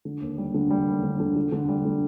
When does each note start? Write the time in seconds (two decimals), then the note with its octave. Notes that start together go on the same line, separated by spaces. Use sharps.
0.05 D3
0.21 D#2
0.38 G3
0.54 D3
0.70 G3
0.87 D#2
1.03 D3
1.20 D3
1.36 D3
1.52 D3
1.69 G3
1.85 D3